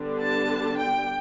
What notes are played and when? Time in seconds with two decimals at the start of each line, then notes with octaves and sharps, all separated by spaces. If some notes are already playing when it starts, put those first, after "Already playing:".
Already playing: D3 G3 B3 D4
0.20 A5
0.78 G5